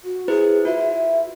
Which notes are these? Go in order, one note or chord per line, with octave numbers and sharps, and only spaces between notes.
F#4
E4 G#4 B4 C5
F4 F#4 E5